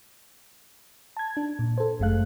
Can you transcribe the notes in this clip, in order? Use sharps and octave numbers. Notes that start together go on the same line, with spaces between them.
A5 G#6
D4
A#2
A4 C5
G1 F#2 G#3 A3 F5 F#6